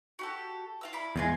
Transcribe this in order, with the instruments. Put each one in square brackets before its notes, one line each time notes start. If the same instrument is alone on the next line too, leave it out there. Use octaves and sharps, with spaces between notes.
[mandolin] F#4 G4 A4
F4 F5 E6
E4 D5 B5
[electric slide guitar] E2 G#3 [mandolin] C4 F4 G#5